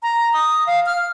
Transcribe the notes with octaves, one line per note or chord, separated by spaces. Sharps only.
A#5
D#6
F5
F6